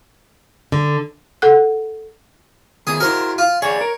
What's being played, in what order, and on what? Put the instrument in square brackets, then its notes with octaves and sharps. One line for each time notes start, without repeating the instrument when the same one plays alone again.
[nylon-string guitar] D3
[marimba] A4 F#5 F#6
[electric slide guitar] D#3 B3 [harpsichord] G#4
[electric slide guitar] E4 F#4 [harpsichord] A#4 C5
[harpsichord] F4
[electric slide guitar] G#4 D5 F5 [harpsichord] C#5
[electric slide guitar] A#4